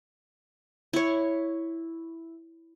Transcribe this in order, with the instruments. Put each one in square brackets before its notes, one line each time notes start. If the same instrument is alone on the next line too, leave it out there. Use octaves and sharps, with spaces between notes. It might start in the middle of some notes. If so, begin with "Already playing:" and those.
[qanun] E4 C#5